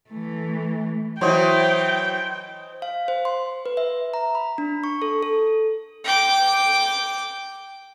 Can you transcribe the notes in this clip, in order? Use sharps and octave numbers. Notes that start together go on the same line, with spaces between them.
E3 A3
E3 F#3 C5 D#5 G5
F5
C5
C6
B4
E5
A#5
B5
D4
C#6
A4
A4
G5 D6